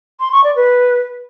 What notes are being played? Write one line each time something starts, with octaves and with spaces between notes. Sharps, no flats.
C6
C#6
D5
B4